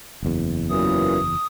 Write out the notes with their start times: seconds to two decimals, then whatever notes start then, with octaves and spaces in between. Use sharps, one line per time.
0.23 F#1 E2
0.70 F#2 A#2 E3 D#6